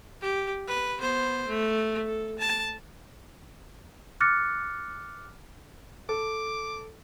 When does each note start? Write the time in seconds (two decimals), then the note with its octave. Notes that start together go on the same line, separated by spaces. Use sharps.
0.21 G4
0.68 B4
0.98 B3 C5
1.48 A3
2.06 A4
2.39 A5
4.20 D6 F6 F#6 A6 A#6 C#7
6.09 A4 D6